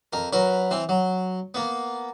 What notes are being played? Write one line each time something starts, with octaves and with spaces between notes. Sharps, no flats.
F2 A#4
F#3 A#4 B4
E3 C4
F#3
A#3 B3